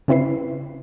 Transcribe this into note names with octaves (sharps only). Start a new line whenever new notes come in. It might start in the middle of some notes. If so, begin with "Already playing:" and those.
C#3 C4 E4 B4 C7